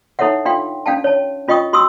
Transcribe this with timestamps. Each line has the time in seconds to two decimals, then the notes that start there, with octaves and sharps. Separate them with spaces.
0.19 D#4 E4 A4 C#5 E5 F#5
0.45 D4 F4 F5 G5 C6
0.86 C#4 D4 F5 G5 A5
1.04 C#5 A5
1.48 C#4 F4 D#5 G5 C#6 D#6
1.73 F#4 C6 C#6 D#6 E6